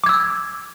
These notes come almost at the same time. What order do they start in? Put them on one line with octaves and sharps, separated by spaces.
D6 G#6 E6